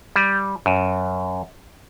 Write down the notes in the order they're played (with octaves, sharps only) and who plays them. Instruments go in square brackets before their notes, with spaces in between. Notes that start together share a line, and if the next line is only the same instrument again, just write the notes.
[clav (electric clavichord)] G3
F#2